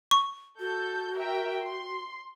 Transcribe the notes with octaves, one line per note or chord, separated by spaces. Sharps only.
C#6
F#4 A4 G6
A#4 E5 G5
C6